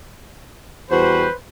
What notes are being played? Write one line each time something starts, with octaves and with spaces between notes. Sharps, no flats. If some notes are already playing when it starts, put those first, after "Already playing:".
E2 G3 F#4 B4 C5